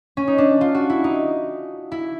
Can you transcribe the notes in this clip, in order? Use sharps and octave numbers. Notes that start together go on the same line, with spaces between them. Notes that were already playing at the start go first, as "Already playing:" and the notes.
C#4
D#4
D4
F4
F#4
E4
D#4
E4